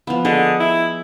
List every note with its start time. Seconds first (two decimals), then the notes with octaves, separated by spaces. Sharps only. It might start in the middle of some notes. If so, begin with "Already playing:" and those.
0.07 F3 B3
0.25 D3 G#4 D#5
0.60 E4